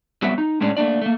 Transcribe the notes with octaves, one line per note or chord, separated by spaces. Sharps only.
F#3 G3 B3 C4 F#4 E5
D#4
A2 G#3 C#4 D4
A3 A#3 D4 D5
A3 A#3